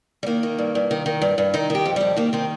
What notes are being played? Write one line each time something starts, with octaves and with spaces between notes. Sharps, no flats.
G3
D#3 A#3
D#3
G2
G2
D#3
D#3
G2
G2
D#3 D#4
D#3
G4
F2
F2 G3
D#3 A#3
D#3 C4